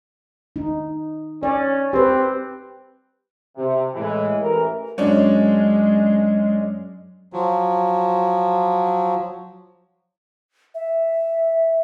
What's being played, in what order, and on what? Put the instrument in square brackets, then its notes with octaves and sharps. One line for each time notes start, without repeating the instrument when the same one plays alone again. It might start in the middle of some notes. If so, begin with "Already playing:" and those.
[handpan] D#4
[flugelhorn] C#4 [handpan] D5
[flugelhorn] C4 [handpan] G4 B4
[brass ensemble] C3
A2 E3 G#3
A1 E3 A#4
[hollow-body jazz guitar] F#2 [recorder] G#3 [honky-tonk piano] C#4 D4
[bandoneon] F3 F#3
[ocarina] E5